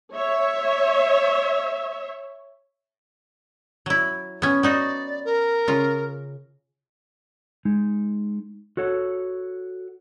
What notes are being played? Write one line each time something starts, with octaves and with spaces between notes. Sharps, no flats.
C#5 E5
F#3 E4
B3 C#4
B3 D#4 F#4 D5
A#4
C#3 F4
G#3 D#4
F#4 A4 C#5 F#5